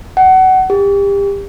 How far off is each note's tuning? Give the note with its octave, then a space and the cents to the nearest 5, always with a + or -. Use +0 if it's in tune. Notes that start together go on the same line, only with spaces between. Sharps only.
F#5 +25
G4 +30